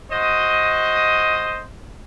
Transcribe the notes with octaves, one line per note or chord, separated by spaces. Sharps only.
F#4 C5 D#5